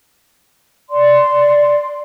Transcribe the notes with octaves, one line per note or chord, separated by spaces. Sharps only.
D5 C6